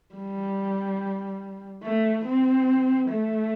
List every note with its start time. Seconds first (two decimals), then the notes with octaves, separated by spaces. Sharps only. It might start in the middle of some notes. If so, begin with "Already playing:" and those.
0.15 G3
1.83 A3
2.25 C4
3.09 A3